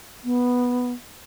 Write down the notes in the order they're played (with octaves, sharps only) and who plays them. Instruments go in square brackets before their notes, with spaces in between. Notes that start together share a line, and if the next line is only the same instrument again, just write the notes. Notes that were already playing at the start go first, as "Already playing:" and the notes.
[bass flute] B3